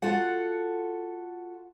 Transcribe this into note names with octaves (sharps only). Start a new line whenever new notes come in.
F4 F#4 A4 F#5